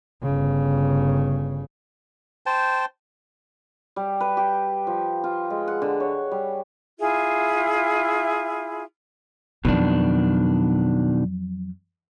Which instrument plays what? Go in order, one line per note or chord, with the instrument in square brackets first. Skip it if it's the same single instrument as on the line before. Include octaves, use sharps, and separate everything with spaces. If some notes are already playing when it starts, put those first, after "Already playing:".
[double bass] G1 C#3
[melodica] C5 G5 A5
[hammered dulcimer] G3
B4
G4
F3
F4
G#3
F#5
D3
C#5
G3
[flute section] E4 F4 G#4 E5
[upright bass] F2 F#3 [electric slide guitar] B2 D#3 D4